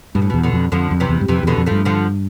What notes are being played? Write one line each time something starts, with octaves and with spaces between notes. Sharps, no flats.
G2 B2
A2
E2 B2
B2 D3
F2
F2 D3 F3
F2
C3 E3
E2
G2
F2 C3 E3
E2 B2 D3
F2
G2 F3 A3
D3 F3